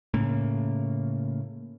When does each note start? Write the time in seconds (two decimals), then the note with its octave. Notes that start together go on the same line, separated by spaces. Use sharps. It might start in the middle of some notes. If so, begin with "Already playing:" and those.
0.14 A2 C#3 A#3